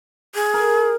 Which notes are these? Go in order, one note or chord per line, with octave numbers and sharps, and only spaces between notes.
G#4
A#4